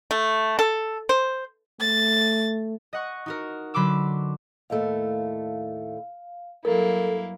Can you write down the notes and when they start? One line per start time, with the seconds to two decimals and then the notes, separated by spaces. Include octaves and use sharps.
0.11 A3
0.59 A4
1.09 C5
1.80 A3 A6
2.93 D#5 F#5 C#6
3.26 D#4 F#4 A#4
3.74 D3 F#3 B5 C6 D6 E6
4.70 D#2 A2 A3 F5
6.65 G2 F#3 A#3 E4 A4 A#4